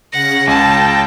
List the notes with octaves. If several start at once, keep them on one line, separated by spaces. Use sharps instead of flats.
C#3 C#4 F#5 A#6
C#2 G5 A5